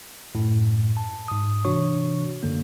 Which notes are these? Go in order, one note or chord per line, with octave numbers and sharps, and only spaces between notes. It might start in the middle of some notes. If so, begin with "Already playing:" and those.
F#2 A2
A5
G#2 D#6
C3 E3 D4 F#4 C#5 C#6
F#2 D3 A#3